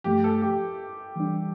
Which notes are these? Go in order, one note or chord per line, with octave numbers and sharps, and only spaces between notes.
G2 F3 A3 G4
A4
G4
E3 G3 D4